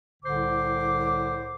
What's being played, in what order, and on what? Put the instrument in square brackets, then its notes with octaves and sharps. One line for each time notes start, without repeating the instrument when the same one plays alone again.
[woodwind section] C2 A2 D3 C5 D6